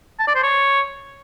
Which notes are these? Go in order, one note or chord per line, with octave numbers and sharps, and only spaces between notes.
A5
D5
C5
C#5